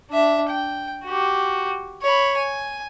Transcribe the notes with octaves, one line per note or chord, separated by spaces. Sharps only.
D4 E5
G5
F#4 G4
C#5 B5
G#5